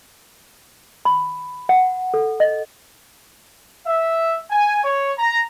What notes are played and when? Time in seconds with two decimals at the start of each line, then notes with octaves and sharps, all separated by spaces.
1.05 B5
1.69 F#5
2.14 A4
2.40 D#5
3.86 E5
4.49 G#5
4.83 C#5
5.18 A#5